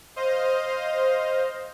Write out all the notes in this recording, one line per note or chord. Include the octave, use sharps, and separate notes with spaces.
C5 D#5 F5